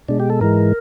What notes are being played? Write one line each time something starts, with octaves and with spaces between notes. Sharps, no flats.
B2 G#3 D4
G4
A4
G#2 E3 G#3 A#4